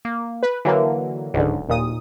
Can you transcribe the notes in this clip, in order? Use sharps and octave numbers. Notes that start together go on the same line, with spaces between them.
A#3
B4
D3 E3 F#3 A#3
D1 C#2 G#2 D3
D#2 A#2 D#6